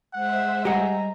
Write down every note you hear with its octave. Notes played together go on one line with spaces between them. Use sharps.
G#3 C5 E5 F#5
G3 G4 G#4 D#5 F#5 G#5 A#5